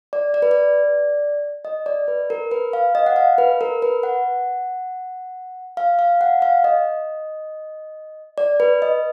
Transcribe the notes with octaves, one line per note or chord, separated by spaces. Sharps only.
D5
D5
B4
D5
D#5
D5
B4
A#4
B4
F5
D#5
F#5
F5
B4
A#4
B4
F#5
F5
F5
F#5
F5
D#5
D5
B4
D#5